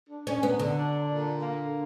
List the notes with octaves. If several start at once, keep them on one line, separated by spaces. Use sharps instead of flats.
D4
C#4
F#3 B3
D3
D4
A#2
A#3